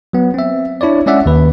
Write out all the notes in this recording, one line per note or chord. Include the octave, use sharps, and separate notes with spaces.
F#3 B3
C4 E5
D4 E4 C#5 D5
G#3 C#4 D5 E5 F#5
D#2 B4